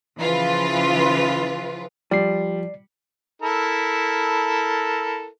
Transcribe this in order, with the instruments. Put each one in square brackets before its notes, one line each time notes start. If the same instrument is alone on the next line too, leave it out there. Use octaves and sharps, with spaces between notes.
[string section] C#3 E3 F3 F4 B4
[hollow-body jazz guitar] F3 [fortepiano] G3 [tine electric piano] D5 C7
[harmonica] E4 A4 A#4